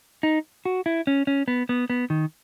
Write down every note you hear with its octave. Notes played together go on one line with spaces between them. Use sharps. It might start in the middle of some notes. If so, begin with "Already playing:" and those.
D#4
F#4
E4
C#4
C#4
B3
B3
B3
D#3